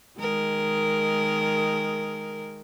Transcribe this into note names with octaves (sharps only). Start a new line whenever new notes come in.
D#3 G#3 A#4